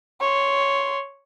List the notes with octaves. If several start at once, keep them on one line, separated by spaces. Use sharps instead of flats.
C#5 C6